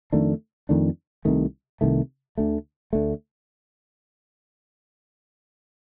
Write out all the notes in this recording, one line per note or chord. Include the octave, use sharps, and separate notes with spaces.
F2 D#3 A3 D4
F2 D#3 A3 D4
C2 C3 D#3 A3
C2 C3 D#3 A3
D2 D3 A3
D2 D3 A3